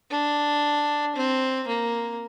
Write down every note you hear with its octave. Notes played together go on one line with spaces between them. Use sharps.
D4
C4
A#3